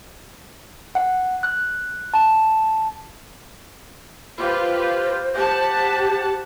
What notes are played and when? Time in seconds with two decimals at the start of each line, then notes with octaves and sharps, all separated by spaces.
0.95 F#5
1.43 F#6
2.14 A5
4.38 F4 G4 B4 C5
5.36 G4 F#5 A5